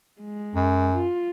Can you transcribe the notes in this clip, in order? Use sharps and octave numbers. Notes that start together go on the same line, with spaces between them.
G#3
F#2
F4